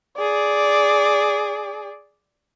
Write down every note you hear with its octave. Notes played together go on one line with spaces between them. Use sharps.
G#4 D5